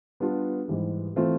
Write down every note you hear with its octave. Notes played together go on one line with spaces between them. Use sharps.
G3 B3 D4 F4
G#2 E3 G3
E3 A3 C4 F4